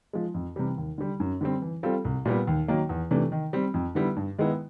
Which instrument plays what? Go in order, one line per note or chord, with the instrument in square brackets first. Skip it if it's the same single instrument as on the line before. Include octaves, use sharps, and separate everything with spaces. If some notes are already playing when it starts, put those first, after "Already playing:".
[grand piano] F3 G#3
F2
C3 E3 G3
D#2
D3 G3
F#2
D3 G3 C4
E3
G3 C4 F4 A4
C2
A#2 G3 B3
D#2
D#3 F#3 A#3
E2
C3 E3 A3 D4
D#3
G3 C4
F2
D3 G3 B3 E4
G2
D#3 G#3 B3 E4